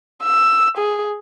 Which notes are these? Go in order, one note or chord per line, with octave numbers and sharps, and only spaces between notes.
E6
G#4